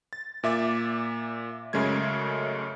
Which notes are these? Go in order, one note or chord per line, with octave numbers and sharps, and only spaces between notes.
A6
A#2 E5 D6 A6
F#2 C#3 G#3 A3 G#6